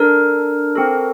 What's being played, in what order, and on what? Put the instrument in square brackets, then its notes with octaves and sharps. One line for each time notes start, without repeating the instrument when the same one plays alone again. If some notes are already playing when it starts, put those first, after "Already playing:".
Already playing: [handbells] D4 A4 A#4
C4 F#4 A4